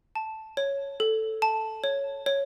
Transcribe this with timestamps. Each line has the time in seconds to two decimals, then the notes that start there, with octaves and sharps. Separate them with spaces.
0.15 A5
0.57 C#5
1.00 A4
1.42 A5
1.84 C#5
2.26 C#5